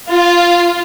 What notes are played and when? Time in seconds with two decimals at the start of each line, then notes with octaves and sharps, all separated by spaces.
0.10 F4